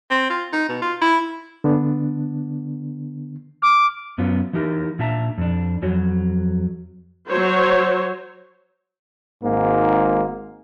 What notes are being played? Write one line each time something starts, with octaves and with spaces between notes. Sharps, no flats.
C4
F4
D#4
B2
F4
E4
D3 B3 D4
D6 F6
F#2 B3 C#4 F4
E3 D#4 G4 A#4
A#2 D4 E5 A5 A#5
F2 D4
F2 F#3 F#4 C#5
F#3 C5 C#5
G#1 G#2 A#3